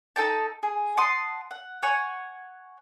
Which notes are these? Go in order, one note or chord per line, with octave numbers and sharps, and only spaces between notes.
D#4 A4 G5 A5
G#4
F#5 A5 C6 D#6
F#5
C#5 F#5 G#5 C#6